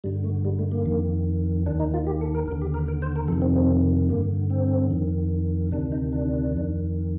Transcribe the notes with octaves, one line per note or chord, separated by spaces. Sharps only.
G2 D3 G3
A3
G3
A3
A#3
F2 D#3
D#2 D#3 D4
D#4
F4
G4
A4
A#4
D#2 D3 A#4
G4
A#4
A#4
C5
A#4
F2 C3 D#3 A4
C4
C4
G2 D3 A#3
C4
F2 D#3
D2 C3 D#3 D4
D#4
D4
F2 D#3